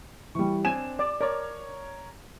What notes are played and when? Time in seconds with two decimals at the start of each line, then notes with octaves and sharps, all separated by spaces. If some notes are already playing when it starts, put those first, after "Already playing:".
0.35 E3 G3 C#6
0.65 C4 D4 G#5 E7
0.99 D5
1.21 A#4 C#5 D5